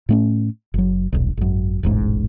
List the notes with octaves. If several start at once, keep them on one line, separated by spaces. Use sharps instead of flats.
A2 A3 C#4
F#1 F#3
D#1 B1
G#1 F#2
E1 A1 G#2